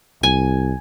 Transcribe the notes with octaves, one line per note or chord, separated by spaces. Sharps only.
C2 G#5